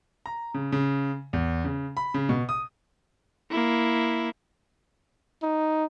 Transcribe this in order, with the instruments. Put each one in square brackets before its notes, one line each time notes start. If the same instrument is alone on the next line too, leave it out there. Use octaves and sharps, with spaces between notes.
[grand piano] A#5
C#3
C#3
E2
C#3
B5
C#3
B2
D#6
[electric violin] A#3 E4
[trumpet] D#4